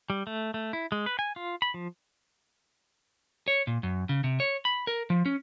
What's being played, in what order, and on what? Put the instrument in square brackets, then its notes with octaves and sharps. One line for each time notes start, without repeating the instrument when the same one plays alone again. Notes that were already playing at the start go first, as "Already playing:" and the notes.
[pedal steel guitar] G3
A3
A3
E4
G#3
B4
G#5
F4
B5
F3
[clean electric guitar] C#5
A#2
F#2
C#3
C3
C#5
B5
A#4
F3
C#4